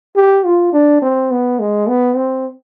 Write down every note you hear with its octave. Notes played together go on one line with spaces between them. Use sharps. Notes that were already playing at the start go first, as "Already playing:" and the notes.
G4
F4
D4
C4
B3
G#3
B3
C4